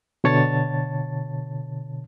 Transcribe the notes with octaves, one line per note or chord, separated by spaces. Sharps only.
B2 D3 C#5 A5 A6